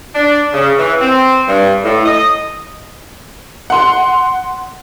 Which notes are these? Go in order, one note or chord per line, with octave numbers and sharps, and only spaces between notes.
D4
C#3
E3
C4
G2
A2
D#5
F#5 C6